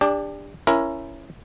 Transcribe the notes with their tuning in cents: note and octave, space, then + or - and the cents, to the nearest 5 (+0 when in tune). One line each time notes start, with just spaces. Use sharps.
D4 +0 G4 +35 D5 +0
C#4 +0 E4 +20 A#4 +10